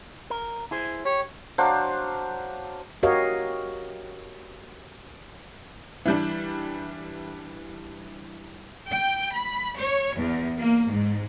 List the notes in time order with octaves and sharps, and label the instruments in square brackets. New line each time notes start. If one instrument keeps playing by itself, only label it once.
[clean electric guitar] A#4
E4 G#4 C5
[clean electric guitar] G4 [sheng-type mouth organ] C#5
[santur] F#3 D4 C5 F5
[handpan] F#4 G4 A#4 C#5 D#5 F5
[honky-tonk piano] E3 G3 D4
[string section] G5
B5
C#5
E2
A#3
G#2